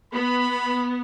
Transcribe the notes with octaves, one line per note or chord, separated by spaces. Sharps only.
B3 B5